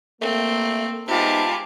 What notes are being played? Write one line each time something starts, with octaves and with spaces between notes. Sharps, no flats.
A3 A#3 C4
C3 G#3 B3 D#4 F4 G4 A5 B5